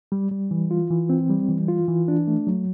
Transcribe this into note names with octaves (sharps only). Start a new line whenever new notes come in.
G3
G3
E3
F4
E3
C4
G3
E3
F4
E3
D4
A3
F#3